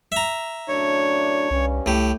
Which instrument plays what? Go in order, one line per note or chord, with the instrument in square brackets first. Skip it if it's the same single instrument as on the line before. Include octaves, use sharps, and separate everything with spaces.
[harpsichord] E5 A#5
[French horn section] F#2 A2 D4 [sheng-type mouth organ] C#5
[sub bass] C2 [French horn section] G2 C#4
[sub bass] C2 [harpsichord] A2 G4